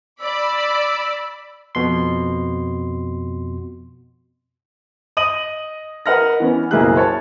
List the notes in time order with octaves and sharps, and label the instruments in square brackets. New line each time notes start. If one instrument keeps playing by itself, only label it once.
[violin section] D5 B5 [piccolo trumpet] E6
[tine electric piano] F2 B2 C6
[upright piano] D#5 D#6 D#7 F#7
A#4 B4 D#5 F#5 F6 A#6
E3 B3 C#4
F#1 B1 A#3 E4 G#4 F#6
C#5 A5